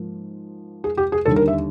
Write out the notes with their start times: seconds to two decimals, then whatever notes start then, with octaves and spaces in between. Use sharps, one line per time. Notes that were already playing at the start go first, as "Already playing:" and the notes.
Already playing: G#2 F3 A#3
0.84 G#4
0.97 G4
1.12 G#4
1.25 D#2 D3 G3 A4
1.36 A#4
1.48 E5